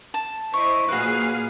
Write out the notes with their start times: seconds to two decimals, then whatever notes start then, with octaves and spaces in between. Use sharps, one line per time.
0.14 A5
0.54 E4 C5 D#5 C#6
0.89 A#2 F#4 G#4 B4 F5